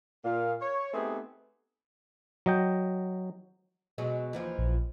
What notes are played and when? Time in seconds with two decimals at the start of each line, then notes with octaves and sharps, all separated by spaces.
0.24 A#2 F5
0.60 C#5
0.93 A3 B3 C4 D#4 G4 G#4
2.46 F#3 D#5 G5
3.98 B2 F#3 G#3
4.33 D#2 E3 F3
4.58 A#1